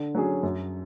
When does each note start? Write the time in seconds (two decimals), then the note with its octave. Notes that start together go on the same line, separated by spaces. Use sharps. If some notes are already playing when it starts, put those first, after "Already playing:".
Already playing: D3
0.15 F#3 C#4 G#4
0.43 F#2